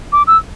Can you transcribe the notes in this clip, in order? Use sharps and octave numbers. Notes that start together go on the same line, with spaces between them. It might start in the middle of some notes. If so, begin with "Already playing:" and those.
D6
E6